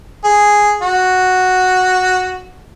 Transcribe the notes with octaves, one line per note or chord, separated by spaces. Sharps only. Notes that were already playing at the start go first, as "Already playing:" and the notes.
G#4
F#4